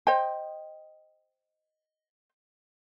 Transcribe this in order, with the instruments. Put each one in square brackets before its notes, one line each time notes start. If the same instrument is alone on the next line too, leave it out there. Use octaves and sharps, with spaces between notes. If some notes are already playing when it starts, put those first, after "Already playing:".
[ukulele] C5 D#5 G5